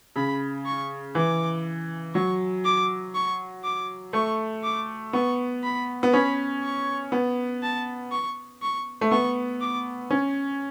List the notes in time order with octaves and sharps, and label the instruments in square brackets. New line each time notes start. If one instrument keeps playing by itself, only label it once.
[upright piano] C#3 [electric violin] B5
[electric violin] C#6
[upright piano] E3 [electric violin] D6
[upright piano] F#3 [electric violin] C#6
[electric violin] D6
C#6
D6
[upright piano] A3 [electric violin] C#6
[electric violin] D6
[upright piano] B3 [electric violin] C#6
[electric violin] B5
[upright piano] B3
[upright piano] C#4 [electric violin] B5
[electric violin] C#6
[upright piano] B3
[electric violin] A5
C#6
C#6
[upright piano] A3
[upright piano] B3 [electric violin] C#6
[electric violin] D6
[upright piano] C#4